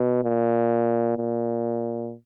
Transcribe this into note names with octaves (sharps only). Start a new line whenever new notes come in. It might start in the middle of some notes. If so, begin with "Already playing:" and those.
Already playing: B2
A#2
A#2